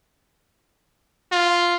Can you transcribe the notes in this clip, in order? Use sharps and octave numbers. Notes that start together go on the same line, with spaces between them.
F4